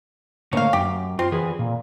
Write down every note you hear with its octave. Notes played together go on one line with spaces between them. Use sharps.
A2 D3 A#3 C#5 F5
F#2 G4
C4 F4
E3 G#4 B4
A#2